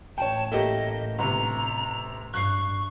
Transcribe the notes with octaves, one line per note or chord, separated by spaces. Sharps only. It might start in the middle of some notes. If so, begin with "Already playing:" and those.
A1 C#5 G5 A5
A3 A#3 G4 D#5
G1 C3 A#5
G2 C#6 F#6 C7